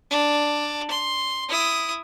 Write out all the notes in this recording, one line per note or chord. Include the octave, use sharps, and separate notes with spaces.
D4
C6
E4 D#6